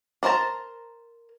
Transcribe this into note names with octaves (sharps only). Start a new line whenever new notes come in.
D4 A#4 C5 A5 A#5